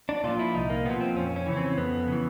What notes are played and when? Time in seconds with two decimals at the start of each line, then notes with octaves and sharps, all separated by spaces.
0.09 D4
0.24 A#2 F3 F4
0.39 E4
0.55 C2 D#4
0.70 A#3
0.85 A#2 F3 B3
1.01 C4
1.16 F2 C#4
1.36 C#4
1.46 C#3 E3
1.57 C4
1.77 F2 B3
2.08 C#3 E3